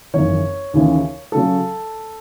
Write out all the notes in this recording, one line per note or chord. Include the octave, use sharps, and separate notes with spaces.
G#1 F#2 C#3 E3 C#5
D#2 C#3 E3
C#3 F#3 A4